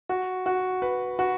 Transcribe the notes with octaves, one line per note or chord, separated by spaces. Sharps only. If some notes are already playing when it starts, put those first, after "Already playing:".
F#4
F#4
B4
F#4